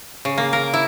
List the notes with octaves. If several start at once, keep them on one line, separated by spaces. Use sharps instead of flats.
C#3
A#3
A#4
E4